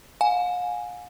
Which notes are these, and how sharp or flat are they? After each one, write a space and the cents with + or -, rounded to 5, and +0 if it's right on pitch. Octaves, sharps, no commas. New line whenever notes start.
F5 +45 G#5 +0